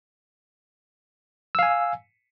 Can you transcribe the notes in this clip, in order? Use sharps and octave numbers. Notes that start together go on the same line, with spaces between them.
F5 G#5 E6